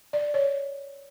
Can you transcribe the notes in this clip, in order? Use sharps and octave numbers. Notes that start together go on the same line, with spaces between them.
D5
C#5